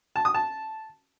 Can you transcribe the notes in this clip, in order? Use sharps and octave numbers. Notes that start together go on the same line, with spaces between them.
A5
D#6
A5